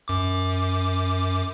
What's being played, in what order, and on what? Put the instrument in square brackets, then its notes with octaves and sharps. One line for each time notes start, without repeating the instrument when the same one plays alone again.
[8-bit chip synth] F#2 D6